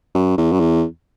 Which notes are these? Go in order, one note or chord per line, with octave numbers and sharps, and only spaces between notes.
F#2
E2
F#2
E2